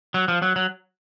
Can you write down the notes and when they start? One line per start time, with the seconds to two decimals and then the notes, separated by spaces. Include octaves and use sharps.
0.14 F#3
0.28 F3
0.42 F#3
0.56 F#3